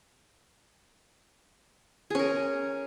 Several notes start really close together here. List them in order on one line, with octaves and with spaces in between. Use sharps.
G#4 C#4 A#4